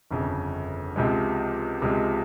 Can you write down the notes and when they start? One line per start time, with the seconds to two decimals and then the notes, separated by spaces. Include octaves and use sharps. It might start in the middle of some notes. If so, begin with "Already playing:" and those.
0.10 G1 F2 C#3
0.96 C#2 C3 F3 G#3
1.82 C#2 C3 F3 G#3